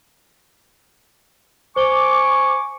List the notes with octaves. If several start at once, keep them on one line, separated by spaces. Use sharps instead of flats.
C5 G#5 C#6 D6 G7